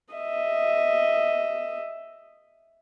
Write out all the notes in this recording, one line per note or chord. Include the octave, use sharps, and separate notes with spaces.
D#5 E5